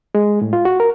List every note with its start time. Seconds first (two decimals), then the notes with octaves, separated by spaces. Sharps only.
0.15 G#3
0.41 A2
0.53 F4
0.65 F#4
0.80 A#4